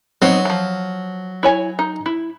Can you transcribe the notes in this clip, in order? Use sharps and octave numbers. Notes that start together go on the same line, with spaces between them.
F#3 B3 C4 D#4
E3 F3
E4 C#5 G#5
D#4
E4